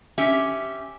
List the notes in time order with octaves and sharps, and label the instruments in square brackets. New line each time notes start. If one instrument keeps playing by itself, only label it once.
[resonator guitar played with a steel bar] C#4 G4 E5